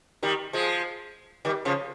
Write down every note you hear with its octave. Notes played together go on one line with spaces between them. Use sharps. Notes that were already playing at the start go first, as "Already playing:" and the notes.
D#3 G3
F3 G#3
D#3 G3
C#3 F3